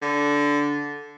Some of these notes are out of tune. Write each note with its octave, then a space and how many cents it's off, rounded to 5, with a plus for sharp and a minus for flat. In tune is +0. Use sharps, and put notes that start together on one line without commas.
D3 -15